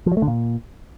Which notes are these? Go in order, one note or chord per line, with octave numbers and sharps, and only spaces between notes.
F3
F#3
A3
D3
A#2